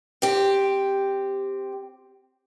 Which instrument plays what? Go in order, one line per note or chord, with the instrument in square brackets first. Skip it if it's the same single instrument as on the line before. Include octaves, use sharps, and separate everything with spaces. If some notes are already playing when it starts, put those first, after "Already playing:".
[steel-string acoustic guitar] C4 G4